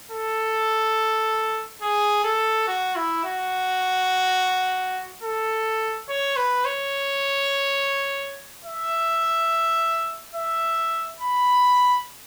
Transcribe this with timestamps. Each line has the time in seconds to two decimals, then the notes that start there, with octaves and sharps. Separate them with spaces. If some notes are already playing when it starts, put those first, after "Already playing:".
0.11 A4
1.82 G#4
2.24 A4
2.68 F#4
2.96 E4
3.24 F#4
5.23 A4
6.09 C#5
6.37 B4
6.65 C#5
8.65 E5
10.35 E5
11.20 B5